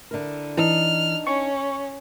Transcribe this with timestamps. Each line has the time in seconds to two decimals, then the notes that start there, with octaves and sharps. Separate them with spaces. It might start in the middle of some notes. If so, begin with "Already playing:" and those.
0.11 D3 E4 A#4
0.57 E3 D4 D#4 F6
1.27 C#4 C#6